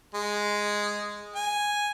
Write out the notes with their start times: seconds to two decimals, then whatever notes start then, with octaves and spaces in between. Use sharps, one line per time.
0.15 G#3
1.35 G#5